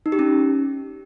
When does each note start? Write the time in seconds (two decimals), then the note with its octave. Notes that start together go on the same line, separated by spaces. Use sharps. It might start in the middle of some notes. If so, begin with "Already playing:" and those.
0.06 D#4
0.12 G4
0.19 C#4